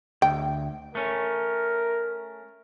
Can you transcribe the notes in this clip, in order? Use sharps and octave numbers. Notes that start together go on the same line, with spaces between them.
D2 G5
A3 C#4 A#4